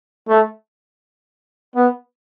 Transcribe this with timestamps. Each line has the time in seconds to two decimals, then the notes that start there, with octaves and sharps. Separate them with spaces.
0.29 A3
1.75 B3